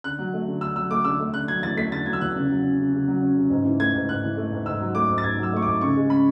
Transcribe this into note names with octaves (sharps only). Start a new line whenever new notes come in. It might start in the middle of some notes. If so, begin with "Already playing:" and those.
D3 F#6
F#3
A3
D3
D3 E6
F#3 E6
A3 D6
D3 E6
A3
D3 F#6
F#3 G#6
E2 A6
A3 B6
D3 A6
F#3 G#6
E6
E2 F#6
C#3
F#3
C#4
C#3
C#3
F#3
C#4
C#3
G#2
E3
A3 G#6
G#2
G#2 F#6
E3
A3
G#2
G#2 E6
F#3
A3 D6
G#2
A6
G#2 G#6
F#3
E6
A3 C#6
G#2 D6
C#3 C#6
G#3
C#4 B5